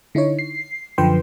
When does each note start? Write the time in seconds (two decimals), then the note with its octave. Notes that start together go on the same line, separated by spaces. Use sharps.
0.15 D3 D#4 E4 C#5
0.39 C7
0.98 F#2 D3 F3 B4 G5 C6